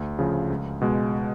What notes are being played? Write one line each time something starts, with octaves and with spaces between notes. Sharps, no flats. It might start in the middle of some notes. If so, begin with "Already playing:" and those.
Already playing: D2
C#3 F3
C#2
B2 G#3